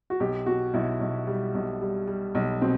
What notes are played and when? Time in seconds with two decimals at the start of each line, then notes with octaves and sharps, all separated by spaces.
0.10 F#4
0.20 B1 G4
0.46 B2 F#4
0.74 B1 E4
1.01 B1
1.27 G3
1.55 B1
1.81 G3
2.07 G3
2.35 B1
2.62 B2 C4